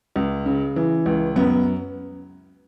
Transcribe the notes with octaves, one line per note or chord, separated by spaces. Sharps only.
C#2
C#3
E3
C#2
F#2 B3